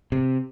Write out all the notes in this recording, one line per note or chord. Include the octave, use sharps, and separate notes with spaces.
C3